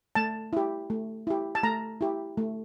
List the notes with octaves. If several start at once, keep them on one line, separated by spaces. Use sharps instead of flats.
A3 A5
E4 G4
A3
E4 G4
A5
A3 A#5
E4 G4
A3